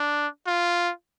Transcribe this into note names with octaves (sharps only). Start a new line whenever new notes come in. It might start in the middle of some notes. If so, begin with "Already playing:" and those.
Already playing: D4
F4